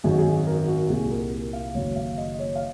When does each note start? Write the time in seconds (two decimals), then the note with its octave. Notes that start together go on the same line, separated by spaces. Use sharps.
0.04 G#1 F#2 D#3 G#4
0.11 F#4
0.18 G#4
0.47 A#4
0.68 F#4
0.89 C2 A#2 G#4
1.11 A#4
1.53 F5
1.75 F#1 F#2 D#3 C#5
1.96 F5
2.18 D#5
2.39 C#5
2.55 F5